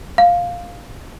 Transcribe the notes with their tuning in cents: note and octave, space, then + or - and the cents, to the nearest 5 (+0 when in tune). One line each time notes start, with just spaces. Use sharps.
F5 +5